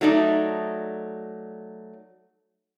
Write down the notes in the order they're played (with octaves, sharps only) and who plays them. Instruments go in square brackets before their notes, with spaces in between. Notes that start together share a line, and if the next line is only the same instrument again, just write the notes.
[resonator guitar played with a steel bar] F#3 A3 D#4 D5